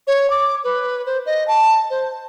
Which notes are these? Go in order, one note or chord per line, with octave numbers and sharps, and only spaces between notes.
C#5
D6
B4
C5
D#5
A5
C5